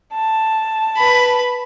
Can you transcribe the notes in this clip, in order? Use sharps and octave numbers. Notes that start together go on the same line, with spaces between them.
A5
B4 B5